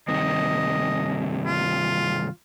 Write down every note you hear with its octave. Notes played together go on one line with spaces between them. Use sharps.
G2 C3 D#3 D#5
F4